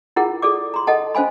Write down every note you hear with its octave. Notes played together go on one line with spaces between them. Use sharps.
E4 F4 G#4 A#4 F#5
G#4 A4 D5 D6
A#5 C6
A4 D#5 F#5 A5
C#4 C5 F5 G#5 B5